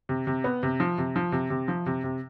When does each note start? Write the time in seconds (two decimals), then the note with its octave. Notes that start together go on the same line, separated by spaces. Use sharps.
0.09 C3
0.27 C3
0.44 B3
0.63 C3
0.80 F3
0.98 C3
1.16 F3
1.32 C3
1.50 C3
1.68 F3
1.86 C3
2.04 C3